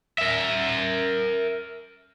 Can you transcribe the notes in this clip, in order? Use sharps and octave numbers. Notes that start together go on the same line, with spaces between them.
A#4 E5